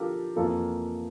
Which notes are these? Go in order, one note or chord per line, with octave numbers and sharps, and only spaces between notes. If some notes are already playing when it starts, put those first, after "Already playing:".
Already playing: D3 F3 F4 G4 A4 A#4
F2 E3 A#3 F4 A4